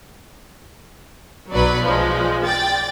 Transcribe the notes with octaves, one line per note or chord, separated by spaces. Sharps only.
B1 F#3 B4 D5
F3 G#3
D5 G5 A6